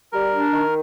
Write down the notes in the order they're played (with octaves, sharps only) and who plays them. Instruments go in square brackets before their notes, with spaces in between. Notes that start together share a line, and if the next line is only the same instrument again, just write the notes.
[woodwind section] G3 [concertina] A#4
[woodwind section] D4
D#3